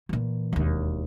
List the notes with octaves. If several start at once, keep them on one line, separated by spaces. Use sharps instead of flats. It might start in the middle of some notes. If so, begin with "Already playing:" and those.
A#2 E3
E1 D#2